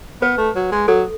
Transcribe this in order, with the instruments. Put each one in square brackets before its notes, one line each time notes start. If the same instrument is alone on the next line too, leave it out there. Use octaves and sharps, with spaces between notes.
[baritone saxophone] B3 [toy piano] B4
[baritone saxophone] A3
F#3
G#3
[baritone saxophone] F#3 [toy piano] A4